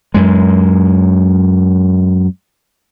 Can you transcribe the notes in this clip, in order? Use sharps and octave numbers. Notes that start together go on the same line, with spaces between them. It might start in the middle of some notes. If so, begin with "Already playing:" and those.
F#2 G#3